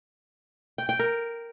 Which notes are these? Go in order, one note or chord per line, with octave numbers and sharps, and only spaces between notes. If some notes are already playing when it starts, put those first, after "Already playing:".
G5
G5
A#4